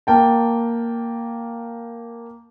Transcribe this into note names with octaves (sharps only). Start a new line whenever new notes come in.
A#3 G5 A5